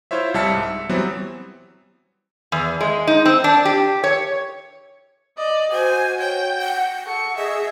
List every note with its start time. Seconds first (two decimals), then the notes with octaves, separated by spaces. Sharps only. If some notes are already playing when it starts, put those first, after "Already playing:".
0.11 E4 F4 C5 C#5 E5
0.34 C2 G3 E5 A5 F6 C#7
0.49 G#2
0.63 E5
0.89 E3 F#3 G3 B3 C4
2.52 E2
2.80 G#3
3.07 D#4
3.25 C4
3.44 D4
3.65 G4
4.04 C#5
5.38 D5 D#5
5.72 F#4 C5 G#5
6.20 C#5 G5
6.61 F#5
7.06 A4 C#6
7.37 G#4 D#5 E5